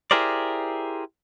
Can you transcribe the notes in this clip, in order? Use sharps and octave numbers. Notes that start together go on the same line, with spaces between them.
E4 G4 G#4 A#4 C5 D5